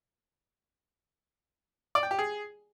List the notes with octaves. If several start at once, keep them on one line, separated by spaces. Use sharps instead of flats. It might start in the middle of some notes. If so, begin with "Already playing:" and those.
D5
G5
G4
G#4